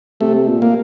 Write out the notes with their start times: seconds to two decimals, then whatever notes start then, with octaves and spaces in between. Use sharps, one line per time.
0.21 C3 A3
0.48 A#2
0.62 A#3